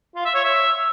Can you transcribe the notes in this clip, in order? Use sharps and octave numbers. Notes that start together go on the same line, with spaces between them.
F4
E5
C#5
E5